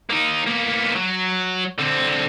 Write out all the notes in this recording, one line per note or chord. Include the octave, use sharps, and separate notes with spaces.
A#3 D#4
A#3 B3
F#3
D3 C4